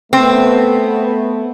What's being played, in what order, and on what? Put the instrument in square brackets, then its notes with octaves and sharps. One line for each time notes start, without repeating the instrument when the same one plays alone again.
[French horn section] A3 B3 [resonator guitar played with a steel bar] C4